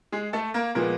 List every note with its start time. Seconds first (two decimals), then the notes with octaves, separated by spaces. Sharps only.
0.12 G#3 G#4
0.33 A3 A4
0.54 A#3 A#4
0.75 A#2 F3 G#3 A#3 B3 A#4